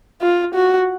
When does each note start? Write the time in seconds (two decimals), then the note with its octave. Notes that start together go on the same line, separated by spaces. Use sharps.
0.22 F4
0.54 F#4